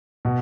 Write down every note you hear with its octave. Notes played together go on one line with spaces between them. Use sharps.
B2